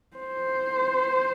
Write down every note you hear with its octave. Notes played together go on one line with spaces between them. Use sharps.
C5